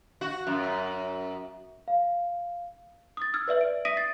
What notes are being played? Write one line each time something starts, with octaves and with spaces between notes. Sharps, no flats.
F#4
F#2
F5
D#6 A6
E6 F6 G#6
B4 D5 E5 F#7
D7
E5 D#6 A#6 B6 D7 D#7
A6 C7